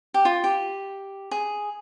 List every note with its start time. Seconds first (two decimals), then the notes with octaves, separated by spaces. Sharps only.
0.14 G4
0.25 F4
0.44 G4
1.31 G#4